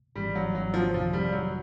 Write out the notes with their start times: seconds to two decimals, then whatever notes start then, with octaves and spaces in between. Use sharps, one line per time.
0.16 G#1 G#2 E3 G3
0.35 F#3
0.55 F#3
0.74 F3
0.94 F2 C3 D#3 F3
1.13 G3
1.32 F#3